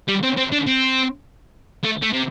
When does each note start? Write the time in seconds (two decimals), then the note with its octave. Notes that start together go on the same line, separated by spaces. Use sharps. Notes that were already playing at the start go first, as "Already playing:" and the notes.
0.08 G3
0.23 C4
0.37 C4
0.52 D4
0.67 C4
1.84 A3
2.02 A3
2.13 C3